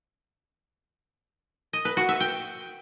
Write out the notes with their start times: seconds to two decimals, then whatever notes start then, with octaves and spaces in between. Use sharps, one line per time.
1.73 D#5
1.85 B4
1.97 F#4
2.09 E5
2.20 G5